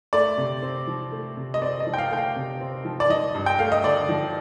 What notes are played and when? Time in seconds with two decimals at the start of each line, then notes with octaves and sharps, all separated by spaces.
0.13 A3 D5
0.38 C3
0.62 C4
0.87 F3
1.12 A3
1.37 C3
1.54 D#5
1.62 C4 D5
1.80 D#5
1.87 F3
1.94 G5
1.98 F5
2.11 A3 G5
2.17 F5
2.36 C3
2.61 C4
2.85 F3
3.00 D5
3.10 F3 D#5
3.35 G2
3.46 G5
3.59 A3 F5
3.72 D#5
3.84 D3 D5
4.09 F3